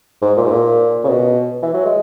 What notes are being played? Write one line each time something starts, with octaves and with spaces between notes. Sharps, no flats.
G#2
A#2
G#2
A#2
C#3
B2
E3
F#3
G#3